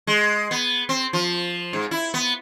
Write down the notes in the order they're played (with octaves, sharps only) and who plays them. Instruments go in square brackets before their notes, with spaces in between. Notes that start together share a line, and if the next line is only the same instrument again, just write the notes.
[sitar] G#3
B3
C4
F3
G#2
E4
B3